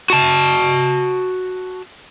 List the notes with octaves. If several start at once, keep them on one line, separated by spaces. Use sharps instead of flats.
F#4 A5